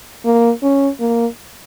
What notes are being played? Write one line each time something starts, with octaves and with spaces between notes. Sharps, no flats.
A#3
C#4
A#3